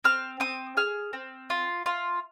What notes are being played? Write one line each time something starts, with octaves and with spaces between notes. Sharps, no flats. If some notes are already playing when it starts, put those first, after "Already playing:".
C4 F6
C4 D#6
G#4 F6
C4
F4
F4